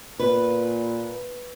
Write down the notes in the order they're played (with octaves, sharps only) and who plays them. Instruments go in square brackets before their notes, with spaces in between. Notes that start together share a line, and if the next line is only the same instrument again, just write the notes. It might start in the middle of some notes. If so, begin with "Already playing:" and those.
[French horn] A#2 [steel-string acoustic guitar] B4